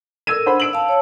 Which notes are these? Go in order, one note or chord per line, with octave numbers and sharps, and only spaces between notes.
A4 A#4 E6 G#6 D#7
D4 C5 F#5 B5
E6 D7 F#7
F5 A5
C#5 A5